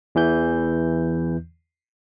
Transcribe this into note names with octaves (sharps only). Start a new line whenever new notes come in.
E2 E3 G6